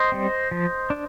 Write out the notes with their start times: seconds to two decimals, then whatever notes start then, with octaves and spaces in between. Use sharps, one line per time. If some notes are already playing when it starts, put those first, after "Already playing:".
Already playing: C5 D#5
0.12 G3 C4
0.51 F3
0.90 D4